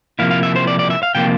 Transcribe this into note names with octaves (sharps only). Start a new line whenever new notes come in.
C3 F3 A#3 E4 F5
F5
E5
C5
D5
D5
E5
F5
C3 F3 A#3 F4 G5